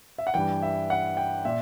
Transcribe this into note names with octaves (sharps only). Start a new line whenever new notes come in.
E5
F#5
G2 E3 G5
E5
F#5
G5
A#2 E5